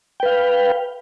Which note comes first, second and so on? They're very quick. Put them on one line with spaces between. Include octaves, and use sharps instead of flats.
G5 B4 F5